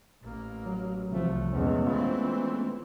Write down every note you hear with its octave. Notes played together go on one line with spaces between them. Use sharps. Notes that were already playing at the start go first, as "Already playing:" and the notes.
A1 A#3
F#3
C2 C3 E3 F3 A3
E2 A#2 G#3 B3 C#4
E3 C4 F4